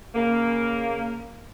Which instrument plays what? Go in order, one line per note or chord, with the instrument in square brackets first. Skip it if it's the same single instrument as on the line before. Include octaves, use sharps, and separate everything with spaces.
[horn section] C#3 A#3